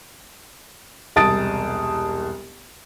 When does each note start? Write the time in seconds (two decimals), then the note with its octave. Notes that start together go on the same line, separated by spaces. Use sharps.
1.16 E1 C2 A5 D#6 A6 D7